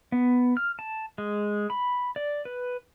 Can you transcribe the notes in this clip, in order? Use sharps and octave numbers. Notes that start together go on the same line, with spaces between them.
B3
F6
A5
G#3
B5
D5
B4